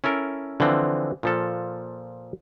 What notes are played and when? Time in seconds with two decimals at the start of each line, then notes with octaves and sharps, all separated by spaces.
0.04 C#4 E4 A4 A#4
0.60 D3 E3 F3 C4
1.23 A#2 F3 A4